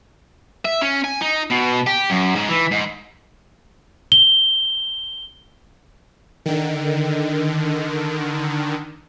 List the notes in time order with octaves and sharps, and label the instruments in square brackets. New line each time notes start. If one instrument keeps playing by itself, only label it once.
[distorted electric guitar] E5
C#4
G#5
D#4
B2
G4
F#2
G#2
E3
G#2
[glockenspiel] G7
[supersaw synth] D3 D#3